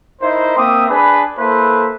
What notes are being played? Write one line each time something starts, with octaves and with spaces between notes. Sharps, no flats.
D#4 E4 A#4 C5
A#3 C4 E5 D6 D#6
D4 G#4 B4
A#3 E4 A4 B4 C5